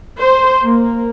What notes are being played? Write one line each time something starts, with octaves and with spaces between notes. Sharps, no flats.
C5
A#3